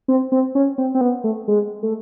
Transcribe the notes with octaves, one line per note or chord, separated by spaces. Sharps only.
C4
C4
C#4
C4
C4
B3
A3
G#3
A3